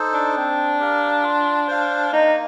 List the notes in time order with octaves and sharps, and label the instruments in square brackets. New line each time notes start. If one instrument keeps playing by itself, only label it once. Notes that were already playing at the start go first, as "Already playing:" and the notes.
Already playing: [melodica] D#4 A4 C5
[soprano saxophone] D4
[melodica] C4
G4 A#4 F5
F4
C5 F5
[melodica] A#3 [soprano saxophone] D#4